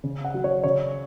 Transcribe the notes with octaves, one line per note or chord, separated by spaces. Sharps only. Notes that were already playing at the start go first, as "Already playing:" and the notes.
C#3
F#5
F#3
C#5
C#3 C#5